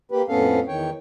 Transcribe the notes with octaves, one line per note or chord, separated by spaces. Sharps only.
A#3 G4 B4
F2 A2 B3 C#4 A4 F5
E2 D#3 C#5 G5